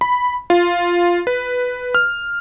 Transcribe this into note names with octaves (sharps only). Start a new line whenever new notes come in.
B5
F4
B4
F6